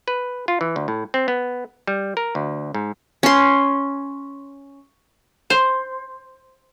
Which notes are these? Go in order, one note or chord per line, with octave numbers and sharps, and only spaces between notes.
B4
F4
E3
D2
A2
C4
B3
G3
A#4
D2
G#2
C#4 C6
C5